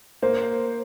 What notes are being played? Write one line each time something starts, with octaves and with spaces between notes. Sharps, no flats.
A#3 C5